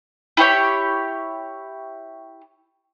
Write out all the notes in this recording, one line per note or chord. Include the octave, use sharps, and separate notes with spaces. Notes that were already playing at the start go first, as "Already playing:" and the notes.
E4 G4 C#5 G5